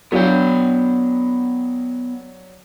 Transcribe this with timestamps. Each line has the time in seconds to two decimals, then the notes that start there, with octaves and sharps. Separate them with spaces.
0.12 F#3 B3 D4 F5 G5